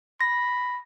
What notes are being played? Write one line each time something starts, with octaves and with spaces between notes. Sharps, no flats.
B5 A#6